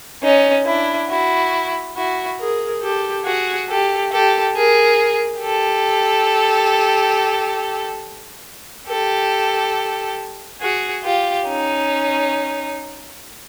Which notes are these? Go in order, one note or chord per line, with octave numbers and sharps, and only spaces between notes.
C#4 D#4
D4 E4
E4 F#4
E4 F#4
G#4 A#4
G4 A4
F#4 G#4
G4 A4
G4 A4
G#4 A#4
G4 A4
G4 A4
F#4 G#4
F4 G4
C#4 D#4